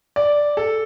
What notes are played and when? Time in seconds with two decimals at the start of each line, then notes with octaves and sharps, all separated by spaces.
0.16 D5
0.57 A4